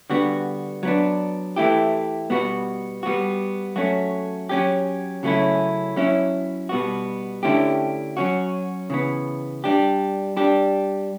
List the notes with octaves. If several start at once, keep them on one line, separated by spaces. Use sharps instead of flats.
D3 G3 B3 F#4
F#3 B3 D4
E3 A3 E4 G4
B2 G3 B3 F#4
G3 B3 F#4
F#3 A3 C#4 F#4
F#3 C#4 G4
C#3 F#3 A3 C#4 E4
F#3 C#4 E4
B2 G3 B3 F#4
D3 A3 C#4 E4 G4
F#3 C#4 F#4
C#3 E3 B3
G3 D4 G4
G3 D4 G4